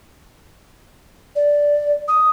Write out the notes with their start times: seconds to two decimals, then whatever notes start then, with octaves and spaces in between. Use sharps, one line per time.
1.36 D5
2.08 D#6